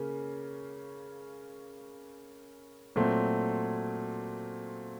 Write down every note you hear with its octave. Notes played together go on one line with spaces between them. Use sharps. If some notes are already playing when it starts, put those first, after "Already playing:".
Already playing: C#3 A#3 C#4
A#2 F#3 A3 C4